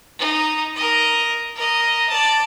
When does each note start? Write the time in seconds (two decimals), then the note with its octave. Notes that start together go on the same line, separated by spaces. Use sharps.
0.19 D#4
0.76 A#4 D#5
1.55 A#4 D#5
2.09 D5 A5